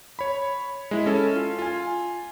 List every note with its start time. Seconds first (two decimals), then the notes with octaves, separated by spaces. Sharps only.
0.19 C#5 B5
0.91 G#3 E4
1.06 C#4 A4
1.36 F4
1.59 F4 G#5